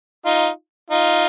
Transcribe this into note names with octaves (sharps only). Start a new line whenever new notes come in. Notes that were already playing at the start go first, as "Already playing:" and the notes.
D#4 F4
D#4 F4